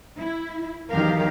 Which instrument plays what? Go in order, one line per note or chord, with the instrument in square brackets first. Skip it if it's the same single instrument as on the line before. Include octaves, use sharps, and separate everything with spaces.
[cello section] E4
E2 D#3 F#3 G4 A#4 F5